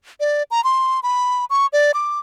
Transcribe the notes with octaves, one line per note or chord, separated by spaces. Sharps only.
D5
A#5
C6
B5
C#6
D5
D6